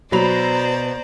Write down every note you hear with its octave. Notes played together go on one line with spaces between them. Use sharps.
B2 F#3 C5 D5 A#5 B5 F7